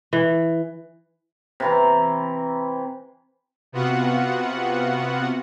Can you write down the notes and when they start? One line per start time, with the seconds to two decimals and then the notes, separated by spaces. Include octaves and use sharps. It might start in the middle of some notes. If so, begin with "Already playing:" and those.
0.13 E3
1.60 C3 E3 A#5
3.72 C3 B3 F4 F#4 F#5